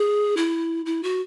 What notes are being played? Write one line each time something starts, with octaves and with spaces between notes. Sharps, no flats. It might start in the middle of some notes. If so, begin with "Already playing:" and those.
Already playing: G#4
E4
E4
F#4